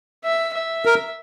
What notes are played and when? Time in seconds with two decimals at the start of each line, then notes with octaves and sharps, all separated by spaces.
0.24 E5
0.54 E5
0.85 A#4